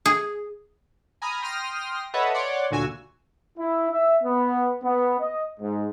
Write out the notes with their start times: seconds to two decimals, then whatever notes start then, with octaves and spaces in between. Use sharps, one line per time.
0.06 G#4
1.22 G#5 A#5 B5 D#6 F6
1.42 G5 C6 D#6 F6 A#6
2.14 A4 B4 C#5 D#5 E5 F#5
2.34 C#5 D5 F#5 C6 D6
2.71 D2 A#2 D3 F#4 G#5 E6
3.58 E4
3.91 E5
4.23 B3
4.82 B3
5.19 D#5
5.60 G#2